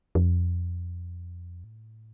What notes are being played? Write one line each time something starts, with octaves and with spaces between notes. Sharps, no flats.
F2
A2